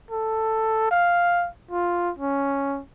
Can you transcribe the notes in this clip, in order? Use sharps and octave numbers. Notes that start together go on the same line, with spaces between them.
A4
F5
F4
C#4